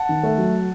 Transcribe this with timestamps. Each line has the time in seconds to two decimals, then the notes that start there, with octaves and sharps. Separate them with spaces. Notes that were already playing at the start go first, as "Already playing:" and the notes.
Already playing: F#5 A5
0.09 D#3
0.23 A3
0.38 F#3